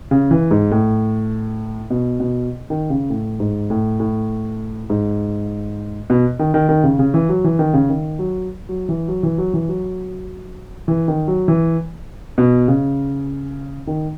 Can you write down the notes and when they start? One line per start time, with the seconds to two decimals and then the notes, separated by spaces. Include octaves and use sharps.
0.11 C#3
0.31 E3
0.51 G#2
0.71 A2
1.90 B2
2.20 B2
2.70 D#3
2.90 C#3
3.10 A2
3.40 G#2
3.70 A2
4.00 A2
4.90 G#2
6.10 B2
6.39 D#3
6.54 D#3
6.69 D#3
6.84 C#3
6.99 C#3
7.14 E3
7.29 F#3
7.44 E3
7.59 D#3
7.74 C#3
7.89 D#3
8.19 F#3
8.69 F#3
8.89 E3
9.08 F#3
9.23 E3
9.38 F#3
9.53 E3
9.69 F#3
10.88 E3
11.08 D#3
11.28 F#3
11.48 E3
12.38 B2
12.68 C#3
13.87 D#3